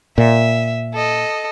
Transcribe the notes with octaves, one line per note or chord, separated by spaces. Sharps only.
A#2 E5
A4 D#5